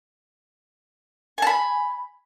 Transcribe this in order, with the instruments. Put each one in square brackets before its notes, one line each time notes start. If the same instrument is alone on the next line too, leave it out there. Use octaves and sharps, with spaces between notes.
[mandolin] G#5
A5
B5